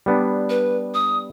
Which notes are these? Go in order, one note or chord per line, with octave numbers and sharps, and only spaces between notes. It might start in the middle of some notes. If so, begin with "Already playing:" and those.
G3 B3 D4
B4
D#6